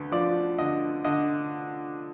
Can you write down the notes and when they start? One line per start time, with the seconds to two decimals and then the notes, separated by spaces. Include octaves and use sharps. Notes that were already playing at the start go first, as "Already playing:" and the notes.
Already playing: D2 D3 B4
0.12 F3 D5
0.58 D3 D#5
1.04 D3 D#5